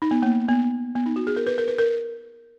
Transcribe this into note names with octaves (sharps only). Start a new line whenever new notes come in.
D#4
B3
A#3
B3
B3
D#4
F#4
G#4
A#4
B4
A#4
B4
A#4